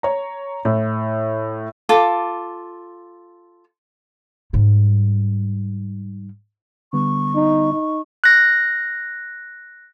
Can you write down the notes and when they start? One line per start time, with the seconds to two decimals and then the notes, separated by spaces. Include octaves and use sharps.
0.03 C#5 A#5
0.65 A2
1.89 F4 A4 D6
4.53 G#2 G3
6.93 D3 G3 B3 C#6
7.35 D#4
7.73 D#4
8.24 F#6 A#6